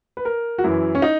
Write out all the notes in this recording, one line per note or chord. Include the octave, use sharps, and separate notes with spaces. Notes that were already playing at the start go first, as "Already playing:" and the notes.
B4
A#4
F#4
F#2 E3 E4
C#4
D#4